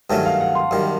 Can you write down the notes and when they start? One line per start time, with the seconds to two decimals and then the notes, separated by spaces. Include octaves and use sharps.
0.10 G2 D#3 F#3 A3 C#4 A5
0.25 F5
0.40 F#5
0.55 C6
0.71 F#2 D#3 G3